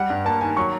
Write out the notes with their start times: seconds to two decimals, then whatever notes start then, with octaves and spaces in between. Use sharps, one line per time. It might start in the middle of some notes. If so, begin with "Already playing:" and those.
Already playing: G3 F#5
0.10 G2
0.25 A#3 A5
0.41 D#3 G#5
0.57 F#3 C#6